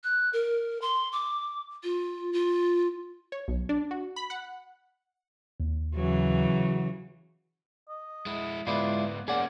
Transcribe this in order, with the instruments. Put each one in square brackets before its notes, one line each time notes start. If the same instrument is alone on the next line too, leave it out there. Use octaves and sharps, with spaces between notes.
[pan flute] F#6
A#4
C6
D6
F4
F4
[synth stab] C#5
B1
D4
F#4
B5
F#5
[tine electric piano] D#2
[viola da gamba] C#3 E3 F#3
[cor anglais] D#5
[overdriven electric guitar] G#3 E4
[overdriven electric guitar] G#2 B3 [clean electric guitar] G#3 E4 F4 [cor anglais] D5
[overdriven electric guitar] A#3 C#4 [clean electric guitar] G#4 F#5 [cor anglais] D5